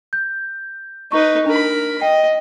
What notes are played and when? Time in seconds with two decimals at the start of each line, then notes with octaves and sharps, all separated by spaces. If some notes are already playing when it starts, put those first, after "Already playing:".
0.13 G6
1.12 D#4 B4 C#6
1.46 D4 A#4 B5
2.01 D#5 G5